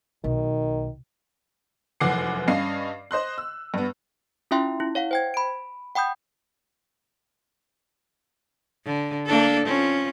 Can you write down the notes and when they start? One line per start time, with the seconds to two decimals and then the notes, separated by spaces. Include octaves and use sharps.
0.24 B1 D#3
2.00 F1 F#2 E3 F#5 D6 C7
2.48 G2 C#4 D#5 F5 C7
3.11 C5 D#5 C6 F#6
3.38 E6
3.74 G2 B3
4.51 C#4 E4 F4 E5 G5 C6
4.80 E4
4.95 C#5 F5 F#5
5.11 C5 G5 G#6
5.34 B5 D7
5.95 F#5 G5 B5 D#6 G6
8.86 D3
9.26 A#3 D4 A4
9.66 C4 C#4 F4